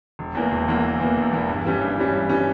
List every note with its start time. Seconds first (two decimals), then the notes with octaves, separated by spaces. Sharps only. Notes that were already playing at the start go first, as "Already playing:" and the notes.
0.19 E1
0.35 E2 E3 A#3
0.51 E1
0.68 E2 E3 A#3
0.83 E1
1.00 E2 E3 A#3
1.17 E1
1.33 E2 E3 A#3
1.49 G2
1.65 E3 G3 C#4
1.81 G2
1.97 E3 G3 C#4
2.14 G2
2.29 E3 G3 C#4